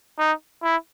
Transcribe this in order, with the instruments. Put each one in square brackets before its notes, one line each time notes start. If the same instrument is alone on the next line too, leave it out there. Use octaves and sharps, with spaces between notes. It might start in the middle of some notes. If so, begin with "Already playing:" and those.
[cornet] D#4
E4